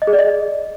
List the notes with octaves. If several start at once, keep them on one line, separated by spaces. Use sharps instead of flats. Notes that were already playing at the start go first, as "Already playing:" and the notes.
D#5
G#4
D5
D#5